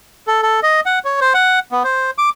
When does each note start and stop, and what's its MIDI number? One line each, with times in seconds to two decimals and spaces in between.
0.27 0.41 69
0.43 0.60 69
0.63 0.80 75
0.86 0.99 78
1.05 1.20 73
1.21 1.33 72
1.34 1.59 78
1.72 1.83 59
1.84 2.11 72
2.18 2.30 86